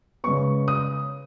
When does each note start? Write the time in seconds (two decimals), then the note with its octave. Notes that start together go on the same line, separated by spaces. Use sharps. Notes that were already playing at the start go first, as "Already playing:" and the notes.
0.24 C#3 G#3 B3 C#6
0.68 D#6